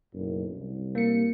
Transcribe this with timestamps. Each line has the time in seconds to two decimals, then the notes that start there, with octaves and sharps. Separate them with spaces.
0.14 F#1 B1 F#2
0.55 C2
0.95 A#3 C#7